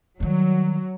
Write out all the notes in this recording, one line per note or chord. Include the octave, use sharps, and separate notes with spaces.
D#3 F#3 G3